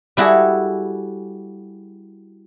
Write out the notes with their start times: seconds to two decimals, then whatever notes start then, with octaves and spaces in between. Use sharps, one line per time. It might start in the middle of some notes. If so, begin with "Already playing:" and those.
0.17 G3 E4 F#4 G#4 A4